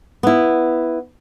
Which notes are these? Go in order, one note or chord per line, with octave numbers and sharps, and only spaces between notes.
B3 E4